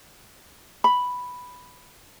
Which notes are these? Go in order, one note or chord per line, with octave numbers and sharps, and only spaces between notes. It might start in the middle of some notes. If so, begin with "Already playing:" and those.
B5